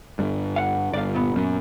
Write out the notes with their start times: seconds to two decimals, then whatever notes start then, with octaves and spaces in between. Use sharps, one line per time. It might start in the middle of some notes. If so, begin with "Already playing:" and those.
0.19 G1 G2
0.56 F5 F#5
0.94 G1 D5 F5
1.14 A#2 B3
1.36 F#2